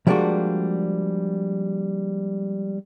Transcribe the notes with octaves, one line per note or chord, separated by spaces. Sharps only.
F3 G3 G#3 A#3 D4 F#4